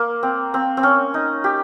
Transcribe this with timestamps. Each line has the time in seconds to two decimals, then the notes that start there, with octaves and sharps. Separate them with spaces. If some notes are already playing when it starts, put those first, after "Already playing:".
Already playing: A#3
0.23 C4
0.54 C4
0.77 C4
0.83 C#4
1.14 D#4
1.44 G4